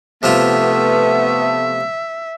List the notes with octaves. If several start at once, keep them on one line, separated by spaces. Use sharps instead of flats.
C3 F3 A3 B3 F4 E5